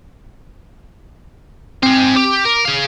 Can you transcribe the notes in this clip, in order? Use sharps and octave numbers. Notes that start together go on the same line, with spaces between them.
C4 G#4 C5
G4 D6
A#4
G#4 F5